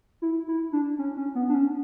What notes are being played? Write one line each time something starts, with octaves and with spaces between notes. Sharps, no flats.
E4
E4
D4
C#4
C#4
B3
D4
C#4